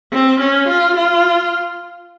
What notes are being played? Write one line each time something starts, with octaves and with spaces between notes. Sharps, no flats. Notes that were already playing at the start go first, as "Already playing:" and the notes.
C4
C#4
F4
F4